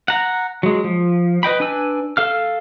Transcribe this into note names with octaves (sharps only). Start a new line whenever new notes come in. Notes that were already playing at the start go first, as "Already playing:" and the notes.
F#5 A#5
F#3 G#3
F3
B4 D#5 G5 B5
D4 B4 G#5 E6
A4 F5 F6